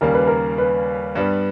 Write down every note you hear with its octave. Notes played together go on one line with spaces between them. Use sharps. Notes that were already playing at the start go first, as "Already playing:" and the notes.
D#2 C#3 G3 A#3 A#4
B4
A#4
B4
G2 G3 B3